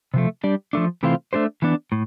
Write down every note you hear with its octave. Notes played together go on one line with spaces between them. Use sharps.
C3 F3 A3
G3 D4 G4 D5
F3 A3 D4
C3 E3 A3 C4 F4
A3 D4 G4 C5
E3 B3 D4
A2